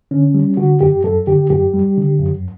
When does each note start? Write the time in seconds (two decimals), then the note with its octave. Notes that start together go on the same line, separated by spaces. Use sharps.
0.11 D3 C#4
0.34 G3
0.57 D3 F#4
0.81 F#2 G4
1.04 F#2 A4
1.27 D3 G4
1.50 F#2 G4
1.73 G3
1.97 D3
2.20 F#2